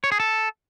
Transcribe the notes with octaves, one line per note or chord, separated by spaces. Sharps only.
C#5
G#4
A4